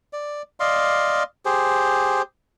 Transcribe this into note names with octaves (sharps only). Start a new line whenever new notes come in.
D5
D5 D#5 F5 C6
G4 G#4 C5